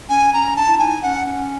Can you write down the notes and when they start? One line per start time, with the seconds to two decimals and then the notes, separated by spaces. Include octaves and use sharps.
0.09 C#4 G#5
0.33 C#4 A#5
0.56 D4 A5
0.67 E4
0.79 D#4 G#5
1.02 C#4 F#5
1.25 C#4